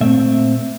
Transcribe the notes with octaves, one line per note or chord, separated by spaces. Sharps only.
A#2 A3 C4 E5